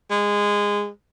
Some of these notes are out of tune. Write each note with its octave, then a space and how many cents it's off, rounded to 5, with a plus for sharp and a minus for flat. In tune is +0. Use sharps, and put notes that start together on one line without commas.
G#3 -15